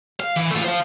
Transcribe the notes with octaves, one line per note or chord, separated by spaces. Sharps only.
F5
E3
A3 F4
C5 F5